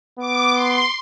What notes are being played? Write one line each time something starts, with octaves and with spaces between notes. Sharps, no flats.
B3 D6
C6